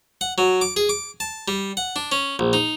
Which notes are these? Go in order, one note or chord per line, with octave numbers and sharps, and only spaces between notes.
F#5
F#3
D6
G#4
D6
A5
G3
F#5
D4
C#4
A#1
D#4